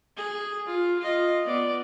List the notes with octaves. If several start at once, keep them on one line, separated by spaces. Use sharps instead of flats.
G#4
F4
F4 D#5
B3 D5